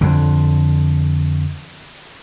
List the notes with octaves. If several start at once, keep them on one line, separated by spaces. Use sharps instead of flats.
F2 D3